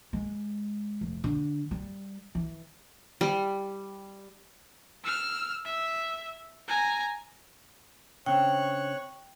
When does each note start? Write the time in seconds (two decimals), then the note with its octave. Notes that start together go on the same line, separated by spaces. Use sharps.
0.13 G#3
1.01 F1
1.24 D3
1.71 G3
2.35 E3
3.21 G3
5.04 E6 F6
5.65 E5
6.68 G#5 A#5
8.26 C#3 C4 D4 C#5 G5 C#6 F#6